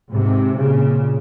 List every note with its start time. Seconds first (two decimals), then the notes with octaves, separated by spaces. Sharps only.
0.11 G#2 C3
0.56 A#2 C#3